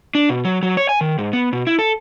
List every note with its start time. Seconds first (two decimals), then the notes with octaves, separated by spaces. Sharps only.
0.15 D4
0.29 B2
0.45 F#3
0.63 F#3
0.77 C#5
0.89 G#5
1.01 D#3
1.18 G#2
1.33 B3
1.53 B2
1.67 E4
1.79 A4